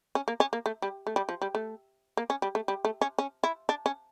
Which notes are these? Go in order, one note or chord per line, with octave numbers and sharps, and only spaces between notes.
C#4
A#3
C#4
A#3
A3
G3
A3
G3
F3
G3
A3
A#3
C#4
G3
A3
G3
A3
C#4
C#4
E4
D4
C#4